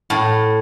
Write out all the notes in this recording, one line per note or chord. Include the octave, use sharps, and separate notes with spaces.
A2